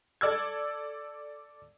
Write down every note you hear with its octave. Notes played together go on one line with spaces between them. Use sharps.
A4 D5 E6 G#6